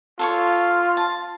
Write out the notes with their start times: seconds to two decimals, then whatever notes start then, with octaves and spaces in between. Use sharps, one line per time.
0.19 F4 A4 C#5 C#6
0.97 A5